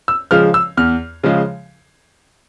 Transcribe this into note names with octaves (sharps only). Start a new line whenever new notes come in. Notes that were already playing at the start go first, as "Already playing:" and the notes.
E6
C#3 F3 G#3 F6
E6
E2 F6
C#3 F3 G#3